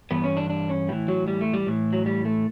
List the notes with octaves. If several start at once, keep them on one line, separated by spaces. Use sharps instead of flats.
G2 E3 B3
C#4
D4
D4
C#4
A2 E3 G3
F#3
G3
A3
G3
A2 E3
F#3
G3
A3